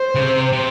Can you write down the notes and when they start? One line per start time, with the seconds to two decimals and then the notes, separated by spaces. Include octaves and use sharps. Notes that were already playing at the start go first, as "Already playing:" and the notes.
Already playing: C5
0.15 C#3
0.21 C3
0.52 C3